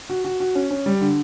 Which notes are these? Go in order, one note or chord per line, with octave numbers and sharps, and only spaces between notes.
F#4
F#4
F#4
C#4
C#4
G3
D3